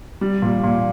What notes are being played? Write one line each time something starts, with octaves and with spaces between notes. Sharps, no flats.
G3
A#2
A#2